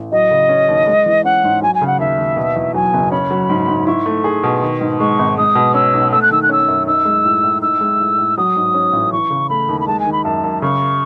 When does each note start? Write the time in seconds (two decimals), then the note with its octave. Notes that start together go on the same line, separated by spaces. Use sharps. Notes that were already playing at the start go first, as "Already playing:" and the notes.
Already playing: A1
0.12 F#3 D#5
0.31 C#3
0.49 C#4
0.69 D#2
0.87 G#3
1.06 E3
1.24 C#4 F#5
1.44 G#2
1.62 F#3 G#5
1.75 G#5
1.81 C#3
1.87 F#5
1.99 D#2 E5
2.18 D#2
2.37 B2
2.56 E2
2.74 F#3 G#5
2.94 F#1
3.12 C#4 B5
3.31 F#3
3.49 G#2
3.68 G#2
3.87 E4 C#6
4.06 A3
4.24 G#4
4.43 B2
4.62 D#3
4.81 G#2
4.99 G#3 C#6
5.19 G#1
5.37 G#3 D#6
5.55 B2
5.74 C#4 E6
5.94 B1
6.12 A3 E6
6.22 F#6
6.31 D#3 E6
6.43 F#6
6.49 C#4 E6
6.68 F#2
6.87 D#4 E6
7.05 G#3
7.25 A2
7.43 A2
7.61 D#4 E6
7.81 G#3
8.00 A2
8.18 A2
8.38 F#3 D#6
8.56 G#2
8.74 C#4
8.93 A1
9.12 E3 C#6
9.30 C#3
9.50 A3 B5
9.69 D#2
9.80 B5
9.87 G#3 A5
10.00 G#5
10.06 D#3
10.12 B5
10.24 F#2 A5
10.44 F#2
10.62 C#3 C#6